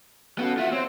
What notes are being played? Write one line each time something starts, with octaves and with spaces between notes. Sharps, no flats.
B3 C#4 F#4 A4 F5
F4 F#4 E5
C4 C5 C#5